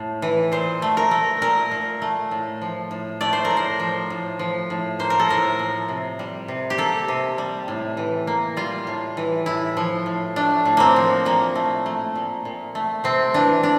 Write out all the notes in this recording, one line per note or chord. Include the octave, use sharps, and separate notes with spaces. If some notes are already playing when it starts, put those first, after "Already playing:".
Already playing: A2 A3
E3
A#2 C5
A3
A#4
A3
A#2 A#4
A#2
A3
A2
F3
A2
A3 D5
C5
A#4
A2
C5
F3
A2
F3
A2
A#3 C5
A#4
A4
A2 A#4
F3
C3
G3
C3
G4
A#3 A4
C3
G3
A2
E3
A#3
G3 F4
A2
E3
A2 E4
F3
A2
A3 D4
A2
A#3 C4
F3
A#2 A#3
A3
A3
A#2
A#2
A3
C3 C4
E3 D4
D4